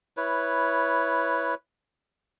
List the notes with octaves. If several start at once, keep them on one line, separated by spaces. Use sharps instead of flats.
E4 B4 C#5